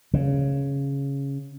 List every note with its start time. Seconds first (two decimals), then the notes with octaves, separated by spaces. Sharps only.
0.14 C#3